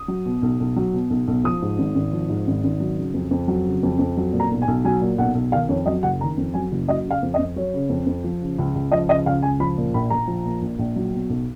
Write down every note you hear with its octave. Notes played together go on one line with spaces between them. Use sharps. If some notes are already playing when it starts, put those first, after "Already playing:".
Already playing: D#6
F#3
B2
B1
B1
F#3
B2
B1
B1
F3 D#6
G#2
G#1
G#1
F3
G#2
G#1
G#1
F#3
C#3
F2
F2
F#3
C#3
F2
F2
F#3
A#2
A#5
B1
G#5
B1
F#3 G#5
A#2
B1 F#5
B1
D#3 F5
F2 C#5
F#3 D#5
F#1 F#5
D#3 A#5
F2
F#3 G#5
F#1
F#3 D#5
C#3
F5
F2
D#5
F2
F#3 C#5
C#3
F2
F2
F3
C#3
C#2
C#2
F3 D#5
C#3 D#5
C#2 F5
C#2 G#5
F3 B5
A#2
A#1 B5
A#1 A#5
F3
A#2
A#1
A#1
F#3
B2
B1